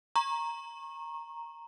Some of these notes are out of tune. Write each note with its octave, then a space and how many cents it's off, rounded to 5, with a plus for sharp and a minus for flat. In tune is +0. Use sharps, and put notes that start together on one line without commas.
A#5 +0 C#6 -30